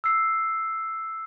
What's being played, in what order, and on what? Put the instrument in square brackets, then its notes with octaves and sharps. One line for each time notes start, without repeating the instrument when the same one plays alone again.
[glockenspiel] E6 C7